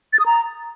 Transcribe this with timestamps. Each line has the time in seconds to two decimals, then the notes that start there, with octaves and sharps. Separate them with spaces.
0.13 A6
0.19 D#6
0.26 A#5